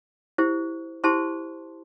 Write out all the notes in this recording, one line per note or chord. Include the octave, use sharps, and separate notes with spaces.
E4 G4 C5
E4 G4 C5 A5 C6